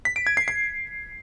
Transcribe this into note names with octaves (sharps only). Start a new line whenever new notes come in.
B6
D7
G#6
C7
C7